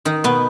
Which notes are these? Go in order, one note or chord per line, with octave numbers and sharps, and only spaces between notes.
D#3 D#4
B2 B3